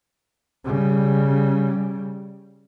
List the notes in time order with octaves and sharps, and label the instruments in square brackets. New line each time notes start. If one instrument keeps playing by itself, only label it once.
[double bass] C#3 G3